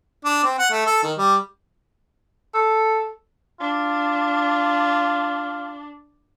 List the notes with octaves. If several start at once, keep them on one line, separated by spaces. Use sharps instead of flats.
D4
C4
F#5
A3
A4
D#3
G3
A4
D4 F4